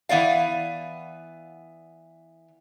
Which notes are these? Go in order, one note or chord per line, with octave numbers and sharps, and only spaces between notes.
E3 B3 D5 F5